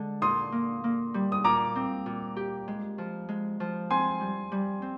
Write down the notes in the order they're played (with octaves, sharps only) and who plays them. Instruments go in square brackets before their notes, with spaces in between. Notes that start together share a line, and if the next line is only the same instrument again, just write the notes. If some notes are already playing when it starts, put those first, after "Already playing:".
Already playing: [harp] D3 G#3 D4
[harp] A#2 [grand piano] C6 D#6
[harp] A#3
A#3
G3
[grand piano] D#6
[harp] A#2 [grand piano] A#5 D6
[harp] C4
A#2
G4
G#3
F3
G#3
F3
[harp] C4 [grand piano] G#5 C6
[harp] G3
G3
C4